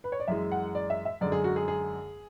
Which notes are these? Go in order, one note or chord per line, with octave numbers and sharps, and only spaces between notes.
B4
C#5
D5
F#2 E3 G#3 E5
F#5
D5
E5
E5
F#2 D3 G#3 D5
G#4
F#4
G#4
G#4